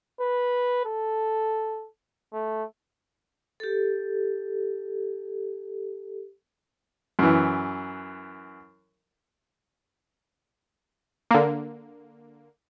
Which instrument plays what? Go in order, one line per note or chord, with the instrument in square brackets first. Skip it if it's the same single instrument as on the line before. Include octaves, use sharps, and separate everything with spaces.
[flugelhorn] B4
A4
A3
[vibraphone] G4 A4
[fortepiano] F#2 E3
[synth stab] D3 A#3